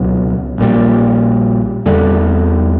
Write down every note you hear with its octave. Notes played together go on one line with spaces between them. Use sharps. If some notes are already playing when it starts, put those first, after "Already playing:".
Already playing: C#2 B2 F#3
A#1 A#2 G3
E2 D3 G3